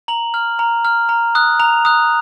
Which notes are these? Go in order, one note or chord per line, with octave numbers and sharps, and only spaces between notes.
A#5 F#7
F6
A#5
F6
A#5
D#6 F#6
A#5 F7
D#6 F#6